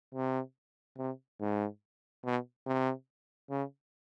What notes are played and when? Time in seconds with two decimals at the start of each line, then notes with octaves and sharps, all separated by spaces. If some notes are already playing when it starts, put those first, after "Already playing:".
0.15 C3
0.98 C3
1.41 G#2
2.25 B2
2.66 C3
3.50 C#3